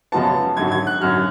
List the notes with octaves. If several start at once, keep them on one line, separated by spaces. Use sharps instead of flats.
F#2 C#3 F3 G#3 B3 A5
G#1 F#2 D3 F#3 G#6
G#6
F#6
G#1 F#2 D3 F#3 F6